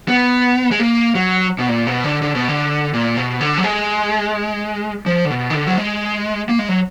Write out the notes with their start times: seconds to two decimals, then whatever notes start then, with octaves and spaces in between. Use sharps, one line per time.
0.08 B3
0.71 G#3
0.79 A#3
1.15 F#3
1.59 B2
1.69 A#2
1.87 B2
2.04 D3
2.22 D3
2.35 B2
2.48 D3
2.93 A#2
3.17 B2
3.41 D3
3.58 F#3
3.64 G#3
5.06 F3
5.25 D3
5.30 B2
5.50 D#3
5.54 D3
5.67 F#3
5.77 G#3
6.49 A#3
6.59 G#3
6.69 F#3